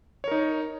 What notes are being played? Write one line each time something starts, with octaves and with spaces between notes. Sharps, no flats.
D#4 A#4 C#5